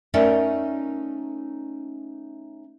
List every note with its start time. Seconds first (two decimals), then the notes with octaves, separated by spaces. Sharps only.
0.14 A3 C#4 D#4 A#4 D5 E5